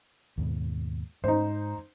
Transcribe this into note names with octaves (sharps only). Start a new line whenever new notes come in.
D#2 G#2 B2
G#2 D#4 C5